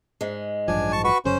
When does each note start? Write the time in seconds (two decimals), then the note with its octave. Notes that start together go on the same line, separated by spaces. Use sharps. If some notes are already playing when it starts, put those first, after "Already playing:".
0.21 G#2 G#3
0.68 A1 G2 F3 D4 G#5
0.92 A5 C#6
1.04 F#4 B4 C#6
1.25 G1 F#2 C#3 C#4 C5